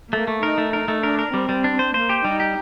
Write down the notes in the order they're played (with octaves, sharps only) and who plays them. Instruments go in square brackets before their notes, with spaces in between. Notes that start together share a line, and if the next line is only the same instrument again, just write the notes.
[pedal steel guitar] A3 [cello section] A#3
[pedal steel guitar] A3
[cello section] D#4 [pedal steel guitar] A#4
[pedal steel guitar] A3
[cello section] D#4 [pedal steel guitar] A#4
[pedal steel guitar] A3
[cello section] D4 [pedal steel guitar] A#4
[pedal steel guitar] A#4
[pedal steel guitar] G3 [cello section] C4
[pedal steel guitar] G3
D4
C5
[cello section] A#3 [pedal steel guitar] C5
[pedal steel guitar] G4
[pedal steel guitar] G3 [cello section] D#4
[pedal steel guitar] G4